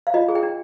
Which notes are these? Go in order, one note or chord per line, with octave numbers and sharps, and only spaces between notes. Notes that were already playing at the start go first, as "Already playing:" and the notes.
F5
F4 D#5
G#4
G5
D4